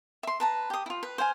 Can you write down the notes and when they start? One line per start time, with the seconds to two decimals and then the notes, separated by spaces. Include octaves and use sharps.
0.23 E5 C6
0.40 B4 A5 A#5
0.70 G4 D#6
0.86 E4 F4
1.03 B4
1.18 C5 F5 F#5 G#5